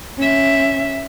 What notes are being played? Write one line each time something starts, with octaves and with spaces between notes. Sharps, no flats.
C#4 E5